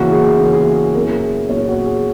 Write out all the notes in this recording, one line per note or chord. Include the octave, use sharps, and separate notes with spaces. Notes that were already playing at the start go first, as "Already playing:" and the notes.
Already playing: C#3 E3 A#3 C#4 F#4
G#4
C#3 E3 A#3 C#4 G#4
G#4
F#4
G#4
A#2 F#3 C#4 E4 A#4
G#4
A#2 F#3 C#4 E4 C#5
F#4
G#4